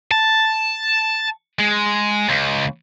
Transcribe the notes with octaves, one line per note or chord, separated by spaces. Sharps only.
A5
G#3
C#2